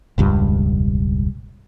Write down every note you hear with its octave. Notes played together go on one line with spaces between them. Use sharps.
E1 C#2 G2